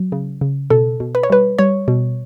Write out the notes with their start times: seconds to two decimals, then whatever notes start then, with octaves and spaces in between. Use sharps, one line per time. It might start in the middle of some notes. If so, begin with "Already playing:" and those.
Already playing: F#3
0.12 C#3
0.41 C#3
0.70 B2 A4
1.00 B2
1.15 B4
1.23 C#5
1.30 G3 B4
1.59 G3 C#5
1.88 B2